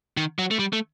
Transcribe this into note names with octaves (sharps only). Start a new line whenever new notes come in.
D#3
F#3
A3
G3
A3